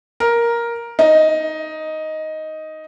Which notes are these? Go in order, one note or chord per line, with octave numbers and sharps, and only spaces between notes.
A#4
D#4